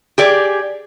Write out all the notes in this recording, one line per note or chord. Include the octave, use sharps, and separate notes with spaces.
G4 G#4 D5